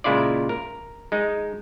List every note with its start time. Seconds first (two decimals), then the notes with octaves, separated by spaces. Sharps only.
0.04 A#2 C#3 G#3 E4 F4 D5
0.49 A#4
1.12 G#3 D#4